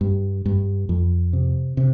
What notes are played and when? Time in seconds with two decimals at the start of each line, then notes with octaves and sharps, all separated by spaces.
0.01 G2
0.46 G2
0.89 F2
1.33 C3
1.77 C3